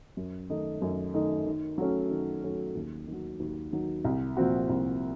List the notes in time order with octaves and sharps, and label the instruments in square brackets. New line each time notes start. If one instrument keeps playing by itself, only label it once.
[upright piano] F#2
D#3 A3 D#4
F#2
D#3 A3 D#4
D#3
F#3 A3 C#4
D#3
F#3 A3 C#4
D#2
D#3
F#3
D#2
D#3 F#3
C2
A#2 F3 C4 F#4
C2